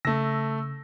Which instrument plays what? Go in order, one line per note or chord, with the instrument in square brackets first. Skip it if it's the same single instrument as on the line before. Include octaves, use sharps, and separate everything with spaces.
[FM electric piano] C#3 E6 [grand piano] A3 A#6